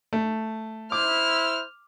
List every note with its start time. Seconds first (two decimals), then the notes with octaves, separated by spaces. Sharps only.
0.13 A3
0.92 E4 C5 D6 F6